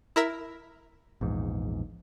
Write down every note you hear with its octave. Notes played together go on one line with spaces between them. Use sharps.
E4 A#4 E5
A#1 E2 G#2